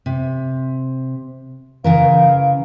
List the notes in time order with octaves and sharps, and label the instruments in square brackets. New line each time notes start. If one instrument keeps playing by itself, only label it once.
[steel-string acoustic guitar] C3
[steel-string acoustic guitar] C#3 E3 A#4 [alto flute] F5